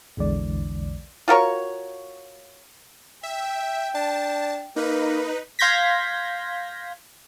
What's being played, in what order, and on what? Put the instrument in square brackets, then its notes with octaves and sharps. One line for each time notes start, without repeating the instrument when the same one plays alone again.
[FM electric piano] A#1 E2 D3 E3 G#3 D5
[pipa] F4 F#4 A#4 C#5
[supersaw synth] E5 [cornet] G5
[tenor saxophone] D4 [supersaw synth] A5
[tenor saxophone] A#3 [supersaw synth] D#4 B4
[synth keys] F5 C6 G6 G#6 A#6 B6